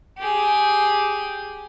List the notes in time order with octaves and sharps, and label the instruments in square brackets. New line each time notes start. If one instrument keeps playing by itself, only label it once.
[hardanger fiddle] G4 G#4